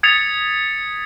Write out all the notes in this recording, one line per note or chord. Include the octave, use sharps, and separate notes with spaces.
D#6 G#6 A6 B6 C#7 F7